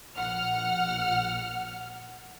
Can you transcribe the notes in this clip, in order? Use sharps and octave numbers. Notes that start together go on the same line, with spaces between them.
A#1 F#5 F6